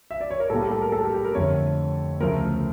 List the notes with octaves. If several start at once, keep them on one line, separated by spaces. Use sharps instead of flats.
E5
D5
C#5
A#4
A2 G3 A#3 A4
G4
A4
A#4
A4
G4
G4
A#4
F2 D3 A3 C#5
D2 C#3 F3 A3 A#4
A#4